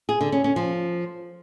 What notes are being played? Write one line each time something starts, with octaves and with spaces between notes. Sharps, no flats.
G#4
D3
C#4
C#4
F3